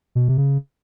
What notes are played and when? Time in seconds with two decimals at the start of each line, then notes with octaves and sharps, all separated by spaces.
0.15 B2
0.28 C3
0.38 C#3